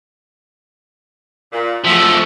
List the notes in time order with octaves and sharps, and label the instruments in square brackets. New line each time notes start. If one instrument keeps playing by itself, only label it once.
[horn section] A#2
[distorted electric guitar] F3 A3 [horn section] F#4 G#4 E5